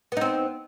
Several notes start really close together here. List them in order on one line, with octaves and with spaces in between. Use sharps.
B3 D#4 C4